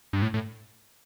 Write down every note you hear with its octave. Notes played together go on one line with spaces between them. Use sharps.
G2
A2
A2